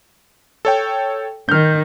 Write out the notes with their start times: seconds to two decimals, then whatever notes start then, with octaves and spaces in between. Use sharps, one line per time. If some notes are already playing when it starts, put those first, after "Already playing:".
0.65 A4 C#5 G5
1.49 D#3 F6 G6